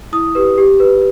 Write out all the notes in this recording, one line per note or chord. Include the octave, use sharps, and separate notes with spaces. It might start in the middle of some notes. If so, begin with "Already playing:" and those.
E4 D#6
G4 B4
G4
B4